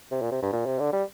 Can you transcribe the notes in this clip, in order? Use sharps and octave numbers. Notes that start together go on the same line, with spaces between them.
C3
A#2
C3
G2
A#2
C3
D3
G3